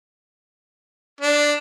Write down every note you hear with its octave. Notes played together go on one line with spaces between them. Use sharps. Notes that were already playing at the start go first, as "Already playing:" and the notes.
D4